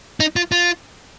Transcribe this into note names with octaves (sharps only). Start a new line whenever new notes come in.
D#4
F4
F4